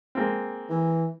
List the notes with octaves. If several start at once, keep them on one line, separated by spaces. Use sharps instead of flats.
G#3 A#3 C4
E3